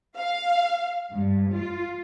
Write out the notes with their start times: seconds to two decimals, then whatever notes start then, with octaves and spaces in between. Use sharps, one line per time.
0.16 F5
1.14 G2
1.54 F4